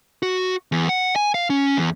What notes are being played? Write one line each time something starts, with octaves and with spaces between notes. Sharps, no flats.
F#4
E2
F#5
G#5
F5
C#4
E2